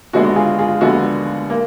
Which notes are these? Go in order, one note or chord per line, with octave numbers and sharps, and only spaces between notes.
D#2 D3 G#3 B3 F#4
F#4
F4 G#4
F4 G#4
D#2 D3 G#3 B3 F#4
A#3